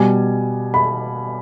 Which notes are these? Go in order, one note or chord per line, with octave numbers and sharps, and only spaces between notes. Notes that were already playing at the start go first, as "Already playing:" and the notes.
Already playing: B2 G3 G#5
B5